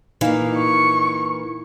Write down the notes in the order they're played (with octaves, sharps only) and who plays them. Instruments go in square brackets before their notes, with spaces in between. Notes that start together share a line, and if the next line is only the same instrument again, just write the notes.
[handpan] A#2 D#4 F5 [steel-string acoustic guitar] E3 A#3
[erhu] C#6